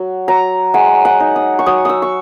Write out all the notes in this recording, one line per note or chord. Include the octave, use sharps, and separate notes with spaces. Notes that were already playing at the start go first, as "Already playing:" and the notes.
Already playing: F#3
F#3 A#5
G#3 F#5
F#5
D#4
D#6
C#6
F#3 D#6
D#6 E6
C#6